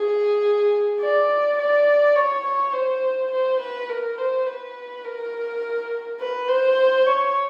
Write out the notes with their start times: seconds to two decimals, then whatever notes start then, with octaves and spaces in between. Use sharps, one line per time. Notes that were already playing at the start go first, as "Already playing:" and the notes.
Already playing: G#4
1.00 D5
1.58 D5
2.16 C#5
2.44 C#5
2.73 C5
3.31 C5
3.60 B4
3.89 A#4
4.18 C5
4.46 B4
5.04 A#4
6.20 B4
6.48 C5
7.06 C#5